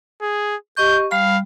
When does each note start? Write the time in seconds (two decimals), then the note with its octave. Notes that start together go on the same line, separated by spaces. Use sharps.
0.22 G#4
0.77 G4 D#5 C#6 G6
1.11 G3 F5 B5